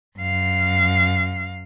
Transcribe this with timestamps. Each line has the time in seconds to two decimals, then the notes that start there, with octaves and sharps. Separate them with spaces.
0.18 F#2 F5